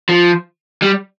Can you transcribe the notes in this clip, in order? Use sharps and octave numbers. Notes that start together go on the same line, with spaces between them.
F3
G3